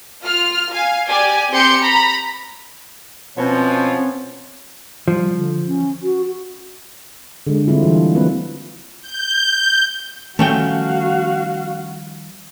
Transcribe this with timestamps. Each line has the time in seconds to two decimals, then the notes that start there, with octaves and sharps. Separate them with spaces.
0.23 F4 F6
0.71 F5 G#5
1.07 G4 D5 G#5
1.51 C4 G4 C6 G6 C#7
1.82 A#5 B5
3.38 B2 F3 C4 C#4 C#5
5.08 F3 G3
5.37 D3
5.67 C#4
6.03 F#4
7.47 D3 G#3
7.67 D3 G3 C4 E4 F4
7.83 E3 F4 A4
8.15 F3 A#3 C4 E4 F#4 B4
9.02 G6
10.39 D#3 F3 G3 A3 C#4 F#4 F5 G5